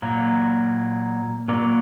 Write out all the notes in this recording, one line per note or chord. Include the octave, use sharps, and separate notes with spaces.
A#2 F#3 A#3
A#2 F#3 A#3